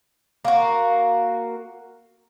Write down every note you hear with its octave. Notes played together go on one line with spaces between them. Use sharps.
A#3 F#4